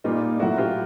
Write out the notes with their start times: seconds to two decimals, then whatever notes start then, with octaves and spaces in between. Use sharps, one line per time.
0.04 A#2 G3 D#4 F4
0.39 A2 F#3 E4 F#4
0.57 F4 G4